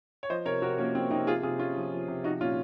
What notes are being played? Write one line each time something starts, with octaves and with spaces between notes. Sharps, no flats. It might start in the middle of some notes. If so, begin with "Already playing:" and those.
C#5
F3 C5 D#5
C3 A#4 C#5
C3 F#4 A#4
F3 A#3 C#4
F3 C4
C3 C4 D#4
F3 F4 G#4
C3 F4 G#4
C3 C#4 F4
F3
F3
C3
F3 D#4 F#4
A#2 C#4 F4